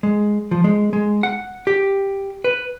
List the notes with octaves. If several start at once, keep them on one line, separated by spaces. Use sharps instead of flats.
G#3
F3
G#3
G#3
F#5
G4
B4